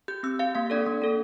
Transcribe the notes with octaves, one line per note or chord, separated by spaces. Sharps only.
G4 G6
C4 E6
G4 F5
A#3 F5
D4 A4 D5
A#3
D4 A4